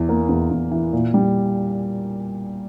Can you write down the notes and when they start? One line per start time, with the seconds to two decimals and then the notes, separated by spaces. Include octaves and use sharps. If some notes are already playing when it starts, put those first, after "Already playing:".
Already playing: E2 E3
0.09 A#3
0.29 E2
0.51 E2
0.72 E3
0.93 A#2
1.14 G3